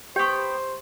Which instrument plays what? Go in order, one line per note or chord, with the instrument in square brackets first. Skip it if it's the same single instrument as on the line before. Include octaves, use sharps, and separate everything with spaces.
[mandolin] B3 G5 [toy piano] G4 C#6 [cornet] C5